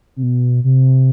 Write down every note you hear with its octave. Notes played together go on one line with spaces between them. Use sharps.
C3
B2
C3